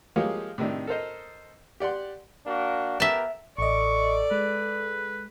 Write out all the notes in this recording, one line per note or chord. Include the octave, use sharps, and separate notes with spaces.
F3 G#3 A#3 G4 C#5 F5
A2 C3 D#3 D4
A4 A#4 C5 D#5
G4 D5 F#5 C6
A#3 D4 F#4
B3 G4 A#4 E5 A5
A1 A4 D5 D#5 C#6
G#3 B4